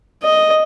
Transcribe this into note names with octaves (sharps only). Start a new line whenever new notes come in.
D#5